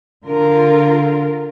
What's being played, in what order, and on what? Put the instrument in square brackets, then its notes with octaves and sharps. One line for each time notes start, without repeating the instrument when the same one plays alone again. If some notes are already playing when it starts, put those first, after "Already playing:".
[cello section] D3 F4 A#4